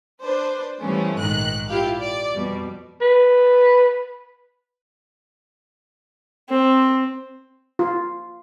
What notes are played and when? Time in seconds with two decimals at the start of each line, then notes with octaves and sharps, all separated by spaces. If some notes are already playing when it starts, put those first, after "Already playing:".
0.22 D4 B4 C5
0.81 E3 F3 G3 A3 B3 C#4
1.17 A#1 G#2 D#3 F#6
1.68 E4 F4 G4 F5
1.97 D5
2.34 F2 B2 G3
3.01 B4
6.49 C4
7.79 F4